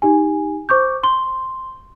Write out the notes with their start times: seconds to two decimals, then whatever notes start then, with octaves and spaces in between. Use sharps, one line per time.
0.02 D#4 G4 G#5
0.69 C5 C#6 D6 G6
1.03 C6 G7